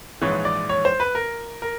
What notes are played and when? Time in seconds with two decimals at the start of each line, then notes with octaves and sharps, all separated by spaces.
0.22 A#1 G#2 E3 G#3 C#5
0.45 D5
0.69 C#5
0.85 C5
1.00 B4
1.15 A#4
1.62 A#4